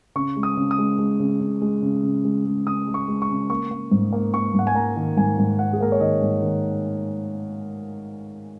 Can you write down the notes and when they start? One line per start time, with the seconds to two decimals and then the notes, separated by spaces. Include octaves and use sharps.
0.16 C#3 C#6
0.36 G#3
0.43 D#6
0.57 C#3
0.71 D#6
0.78 G#3
0.99 G#3
1.20 C#3
1.41 C#3
1.62 G#3
1.82 C#3
2.03 C#3
2.25 G#3
2.45 G#3
2.66 C#3 D#6
2.87 G#3
2.94 C#6
3.08 G#3
3.22 C#6
3.29 C#3
3.50 A#3 C#6
3.71 A#3
3.91 G#2
4.13 A#3
4.34 A#3 C#6
4.54 G#2 F#5
4.67 G#5
4.75 A#3 A#5
4.96 D#3
5.17 G#2 G#5
5.38 G#2
5.59 A#3 F#5
5.73 G#4
5.80 A#3 A#4
5.92 C#5
6.01 D#3 D#5
6.22 G#2
6.42 D#3